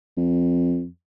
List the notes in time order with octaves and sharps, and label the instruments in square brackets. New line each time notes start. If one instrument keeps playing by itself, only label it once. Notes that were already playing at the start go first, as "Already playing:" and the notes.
[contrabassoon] F2